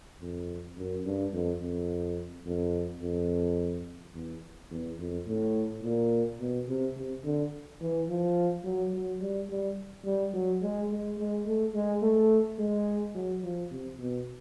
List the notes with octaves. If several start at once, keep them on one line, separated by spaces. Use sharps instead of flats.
F2
F#2
G2
F2
F2
F2
F2
E2
E2
F2
A2
A#2
B2
C3
C3
D3
E3
F3
F#3
F#3
G3
G3
G3
F#3
G#3
G#3
G#3
A3
G#3
A3
G#3
F#3
F3
C3
B2